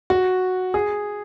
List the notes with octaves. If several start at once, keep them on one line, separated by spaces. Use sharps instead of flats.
F#4
G#4